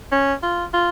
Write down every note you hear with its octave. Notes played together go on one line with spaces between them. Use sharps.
C#4
F4
F4